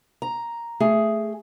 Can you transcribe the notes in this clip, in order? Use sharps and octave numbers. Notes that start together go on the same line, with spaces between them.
A#5
A3 G#4